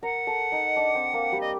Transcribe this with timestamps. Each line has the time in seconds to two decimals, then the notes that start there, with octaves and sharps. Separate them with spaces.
0.03 A#4 F#5 A#5
0.27 A4 A5
0.52 D#4 D#5
0.76 D4 D5
0.95 C4 C5
1.14 A#3 A#4
1.32 G3 G4
1.41 D#5